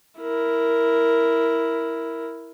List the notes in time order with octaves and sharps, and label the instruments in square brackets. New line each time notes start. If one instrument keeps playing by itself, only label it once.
[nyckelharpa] E4 A#4